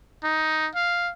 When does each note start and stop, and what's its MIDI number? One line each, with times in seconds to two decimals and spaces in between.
0.24 0.68 63
0.75 1.12 77